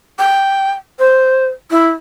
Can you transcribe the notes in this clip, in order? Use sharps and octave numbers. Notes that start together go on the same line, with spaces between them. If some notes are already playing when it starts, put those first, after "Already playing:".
G5
C5
E4